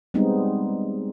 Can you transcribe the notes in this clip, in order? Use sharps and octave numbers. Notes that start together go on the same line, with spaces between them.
G3 G#3 B3 C4 D#4